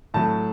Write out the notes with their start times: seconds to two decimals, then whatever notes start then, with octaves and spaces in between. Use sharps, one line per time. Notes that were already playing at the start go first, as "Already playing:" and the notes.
0.14 A2 F#3 A3 A5